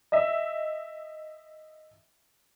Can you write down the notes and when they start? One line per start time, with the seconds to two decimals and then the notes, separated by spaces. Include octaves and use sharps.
0.12 D#5 E5